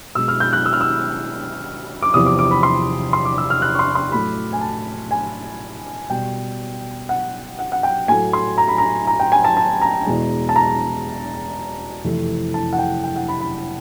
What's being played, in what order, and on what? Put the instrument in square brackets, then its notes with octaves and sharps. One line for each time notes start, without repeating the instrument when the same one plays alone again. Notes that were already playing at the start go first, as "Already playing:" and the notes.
[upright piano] B2 G#3 E6
F6
G6
F#6
E6
F6
E6
D6
E2 C3 F3 D#6
D6
D6
B5
C6
C6
D6
E6
F6
F#6
C#6
C6
C6
A2 F#3 A3 B5
G#5
A5
G#5
B2 G3 G5
F#5
F#5
F#5
G5
A2 F#3 A3 G#5
C6
A#5
B5
A#5
A#5
G5
G#5
A5
A5
A#5
E2 B2 G#3
A5
A#5
F2 C3 E3 A3
A5
F#5
G5
G5
F#5
B5
B5